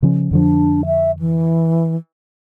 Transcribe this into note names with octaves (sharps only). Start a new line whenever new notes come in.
C#3 F3 C#4
F2 D3 F3 D4
E5
E3